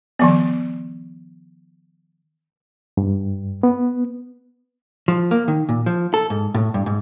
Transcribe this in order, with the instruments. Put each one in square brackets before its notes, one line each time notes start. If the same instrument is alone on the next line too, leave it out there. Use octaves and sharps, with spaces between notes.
[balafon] D#3 F3 B3
[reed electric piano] G2
B3
[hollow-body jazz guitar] F3
A#3
D#3
A#2
F3
A4
G#2
A2
G2
G#2